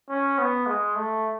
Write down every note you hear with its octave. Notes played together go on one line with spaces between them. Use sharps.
C#4
B3
G#3
A3